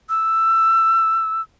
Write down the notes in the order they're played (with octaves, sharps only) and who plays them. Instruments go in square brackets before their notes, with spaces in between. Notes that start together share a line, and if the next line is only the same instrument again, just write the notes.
[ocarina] E6